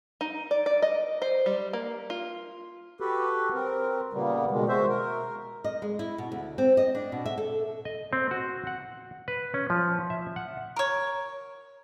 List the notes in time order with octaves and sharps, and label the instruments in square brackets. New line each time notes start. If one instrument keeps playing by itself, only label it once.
[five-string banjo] D#4
D5
D5
D#5
C5
G3
A#3
F4
[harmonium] F#4 G4 A4 B4
C4 A#4
A#2 C#3 G3 A#3 B3
B2 D#3 G#3
G#3 F#4 C5 E5
A#4
[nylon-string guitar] D#5
G#3
E4
B2
D2
C4
D#5
D4
B2
E5
A4
[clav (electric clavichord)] D#5
C4
F#4
F#5
B4
C#4
F3
E5
F#5
[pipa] A#4 C#5